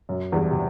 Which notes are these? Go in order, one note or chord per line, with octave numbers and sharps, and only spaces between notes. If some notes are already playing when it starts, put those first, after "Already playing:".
F#2
E2 G2
C3